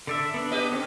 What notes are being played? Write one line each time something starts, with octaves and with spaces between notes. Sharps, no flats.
D3 A4 D5 E5
B3 D4
G4 B4 D#5
C4 C#4